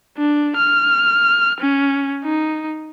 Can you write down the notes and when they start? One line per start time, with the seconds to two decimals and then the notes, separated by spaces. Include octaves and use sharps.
0.17 D4
0.56 F6
1.60 C#4
2.24 D#4